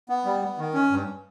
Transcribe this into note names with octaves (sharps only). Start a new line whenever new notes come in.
B3
G3
B3
D#3
C#4
G2